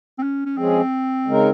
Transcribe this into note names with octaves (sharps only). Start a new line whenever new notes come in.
C4
C#4
C#4
F3 G#3 C4 C#4 G#4
C#3 G#3 D#4 A#4